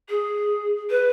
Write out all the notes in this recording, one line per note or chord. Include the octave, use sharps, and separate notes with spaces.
G#4
B4